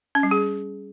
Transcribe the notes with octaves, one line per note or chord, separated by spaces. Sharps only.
C#4
G3
G#4